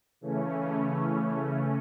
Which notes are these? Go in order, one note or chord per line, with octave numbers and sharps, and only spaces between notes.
C#3 E3 A3 C#4